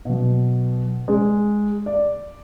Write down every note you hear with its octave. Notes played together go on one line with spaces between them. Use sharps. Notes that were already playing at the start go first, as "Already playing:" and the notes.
B2 F#3
G#3
D5